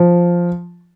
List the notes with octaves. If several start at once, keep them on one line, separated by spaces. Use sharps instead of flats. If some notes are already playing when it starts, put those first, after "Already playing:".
Already playing: F3